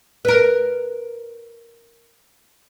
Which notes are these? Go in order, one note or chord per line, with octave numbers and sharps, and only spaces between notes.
A#4 B4